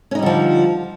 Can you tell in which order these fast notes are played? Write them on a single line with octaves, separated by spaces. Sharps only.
C#4 D#4 G3 D3 F3